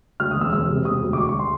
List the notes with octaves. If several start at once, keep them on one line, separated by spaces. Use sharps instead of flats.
D2 F6
D#6
E1
E6
E1 E6
C3
E1 D#6
D2
D6
D2 C#6
C#6
C6